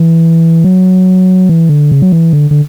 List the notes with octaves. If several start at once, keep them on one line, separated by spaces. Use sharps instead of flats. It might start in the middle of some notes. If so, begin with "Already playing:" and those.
Already playing: E3
F#3
E3
D3
C#3
F#3
E3
D3
D3